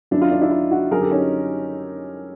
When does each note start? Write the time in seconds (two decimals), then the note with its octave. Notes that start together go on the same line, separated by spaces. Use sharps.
0.11 F#2 D#3 D4 E4
0.22 D#4 F4
0.31 D4
0.42 D4 E4
0.51 D#4 F4
0.71 E4 F#4
0.91 F#2 D3 G#4 A#4
1.01 G4 A4
1.11 C#4 D#4